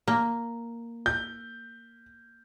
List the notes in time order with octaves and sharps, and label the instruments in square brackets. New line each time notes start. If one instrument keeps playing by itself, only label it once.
[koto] A#3
[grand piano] G6